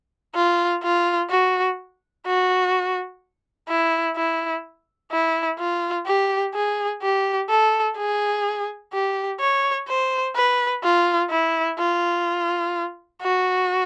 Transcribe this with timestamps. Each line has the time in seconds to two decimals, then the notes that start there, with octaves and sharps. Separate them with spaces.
0.35 F4
0.83 F4
1.30 F#4
2.26 F#4
3.69 E4
4.16 E4
5.12 E4
5.59 F4
6.06 G4
6.54 G#4
7.02 G4
7.49 A4
7.97 G#4
8.93 G4
9.40 C#5
9.88 C5
10.36 B4
10.84 F4
11.31 E4
11.79 F4
13.22 F#4